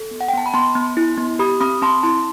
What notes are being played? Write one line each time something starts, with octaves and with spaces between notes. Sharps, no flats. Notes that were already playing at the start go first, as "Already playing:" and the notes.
Already playing: A4
B3
F#5
G5
B3 A5
B5
B3 A5 C6
B3
E4
B3
G4 B5 D#6
C4 B5 D#6
C4 A5 C6
E4 A5 C6